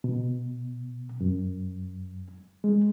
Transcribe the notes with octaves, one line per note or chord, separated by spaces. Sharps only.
B2
F#2
G#3